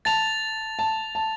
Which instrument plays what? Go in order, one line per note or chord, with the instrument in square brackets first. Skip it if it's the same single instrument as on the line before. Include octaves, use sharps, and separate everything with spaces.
[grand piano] A5 [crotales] A6 F7
[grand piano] A5
A5